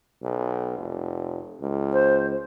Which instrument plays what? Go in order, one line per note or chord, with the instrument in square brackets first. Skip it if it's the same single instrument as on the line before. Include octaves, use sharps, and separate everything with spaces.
[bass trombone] B1
F1
C#2
[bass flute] C5